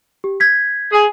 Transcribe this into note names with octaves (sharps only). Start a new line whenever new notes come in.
G4
G6 G#6 B6
G#4